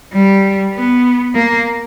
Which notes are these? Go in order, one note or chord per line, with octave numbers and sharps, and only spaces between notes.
G3
B3
A#3